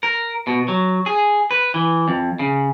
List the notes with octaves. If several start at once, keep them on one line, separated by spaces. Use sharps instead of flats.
A#4
B2
F#3
G#4
B4
E3
F2
C#3